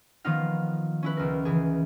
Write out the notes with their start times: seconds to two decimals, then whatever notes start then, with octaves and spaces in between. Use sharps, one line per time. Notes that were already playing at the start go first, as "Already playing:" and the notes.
0.25 D#3 F3 B3 D#4 F4 F5
1.03 C#4 E4 B4
1.17 C#2 A#4
1.45 C#3 E3 G#4